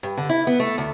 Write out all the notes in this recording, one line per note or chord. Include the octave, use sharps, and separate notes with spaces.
G2
D3
E4
B3
A3
D2